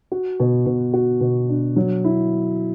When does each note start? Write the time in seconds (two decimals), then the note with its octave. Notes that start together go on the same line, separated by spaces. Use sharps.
0.12 F#4
0.40 B2
0.66 B2
0.94 F#4
1.21 B2
1.49 D4
1.76 F#3
2.04 E4